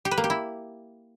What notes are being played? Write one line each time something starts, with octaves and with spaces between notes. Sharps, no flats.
G4
B4
A#3
G4
E4